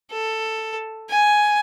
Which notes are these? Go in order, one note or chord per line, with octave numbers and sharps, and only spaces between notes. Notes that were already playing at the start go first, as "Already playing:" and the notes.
A4
G#5